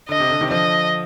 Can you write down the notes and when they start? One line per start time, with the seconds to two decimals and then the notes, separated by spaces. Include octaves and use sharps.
0.09 D3 D#5
0.20 C3
0.30 D3
0.40 C3 D#3
0.51 D3 F3 D#5